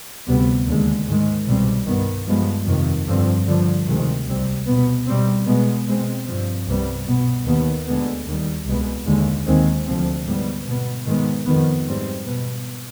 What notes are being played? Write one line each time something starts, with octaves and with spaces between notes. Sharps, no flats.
D2 C3 G3 B3
D#2 D3 G#3
G#2 D#3 G#3
C2 B2 G3 C4
G2 D#3 B3
G2 F3 G#3 B3
F2 C3 D#3
G2 D3 F3 C4
G2 D3 F3
D2 C3 D#3 G#3 C4
C2 C3 G3 C4
B2 B3
B2 G3 C4
B2 G#3 B3
B2 G#3 C4
G2 F3 C4
C2 C3 G3 B3
B2 B3
D#2 D#3 B3
D2 D3 G#3 B3
D#2 D#3 G3
C2 B2 G#3 B3
D#2 D3 G#3
D#2 D#3 G#3 C4
D2 C3 F3 C4
G#2 G3 B3
B2 B3
G#2 D#3 G#3 B3
F2 D#3 B3
G#2 G3 C4
B2 B3